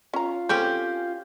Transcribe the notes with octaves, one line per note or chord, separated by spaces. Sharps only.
C#4 F4 A#5
C4 C#4 G4 A4 C#5 G5 G6